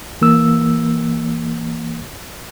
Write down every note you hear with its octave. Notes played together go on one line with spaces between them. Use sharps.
E3 A#3 E6